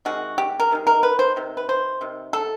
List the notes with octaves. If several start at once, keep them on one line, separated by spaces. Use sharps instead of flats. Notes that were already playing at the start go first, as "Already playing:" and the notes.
C3 D#3 G#3 F#4
G4
A#4
C3 D#3 G#3
A#4
B4
C5
C3 D#3
B4
C5
C3 D#3
A4